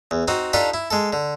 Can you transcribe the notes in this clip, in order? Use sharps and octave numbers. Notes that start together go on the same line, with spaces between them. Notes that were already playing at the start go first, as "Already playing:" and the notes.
E2
C4 D#4 F#4
D4 D#4 F4 G4 A4
E4
G#3 A4
D3